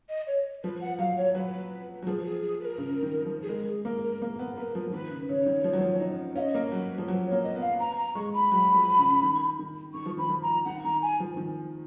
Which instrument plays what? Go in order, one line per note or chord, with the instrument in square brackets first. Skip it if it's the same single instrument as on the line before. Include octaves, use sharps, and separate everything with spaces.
[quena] D#5
C#5
[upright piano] F3 [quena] B4
[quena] F#5
[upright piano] F#3 [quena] F5
[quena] C#5
[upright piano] F#3 [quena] B4
[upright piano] F#3
[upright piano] F3 [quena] G#4
[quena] G#4
G#4
B4
A#4
[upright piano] C#3
D#3
F3
[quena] G#4
[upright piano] G#3 [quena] A#4
[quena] G#4
[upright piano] A#3 [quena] A#4
[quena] A#4
[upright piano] A#3
B3
[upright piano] A#3 [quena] B4
[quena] A#4
[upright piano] F3
F3
[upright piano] D#3 [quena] B4
[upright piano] C#3
[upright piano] C#3 [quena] C#5
[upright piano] D#3
F3
F#3
F3
D#4
[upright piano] C#4 [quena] F5
[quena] D#5
[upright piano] A#3
[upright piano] F#3 [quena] B4
[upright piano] F3
[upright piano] F#3 [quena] B4
[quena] C#5
[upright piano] A#3
[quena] D#5
[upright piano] B3 [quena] F5
[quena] A#5
A#5
[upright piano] G#3 [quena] C#6
[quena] B5
[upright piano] F#3
F3
C#3
D#3
D#3
[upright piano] D#3 [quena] C#6
[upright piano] F3
[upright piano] D#3 [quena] B5
[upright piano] F3
[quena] A#5
[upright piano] D#3 [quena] F#5
[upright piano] D#3 [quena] A#5
[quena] G#5
[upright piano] F3
D#3